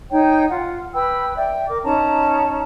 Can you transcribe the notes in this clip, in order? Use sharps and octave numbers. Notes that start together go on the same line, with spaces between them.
D#4 C#5 G5
F4 F#5
B4 G5 B5 E6
D5 E5 G5
A#4 D6
C#4 D#4 A5 A#5